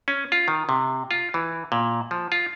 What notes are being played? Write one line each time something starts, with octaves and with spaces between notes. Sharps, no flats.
C#4
F4
D#3
C3
F4
E3
A#2
F3
F4